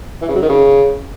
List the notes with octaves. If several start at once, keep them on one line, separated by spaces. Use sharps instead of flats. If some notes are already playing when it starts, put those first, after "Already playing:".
E3
C#3
F#3
D#3
C#3